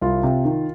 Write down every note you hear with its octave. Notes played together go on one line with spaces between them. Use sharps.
C2 F4
C3
D#3